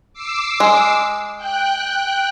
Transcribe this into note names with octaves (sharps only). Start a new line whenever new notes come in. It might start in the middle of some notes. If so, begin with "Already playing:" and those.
D6 E6 C7
G#3
G5 F#6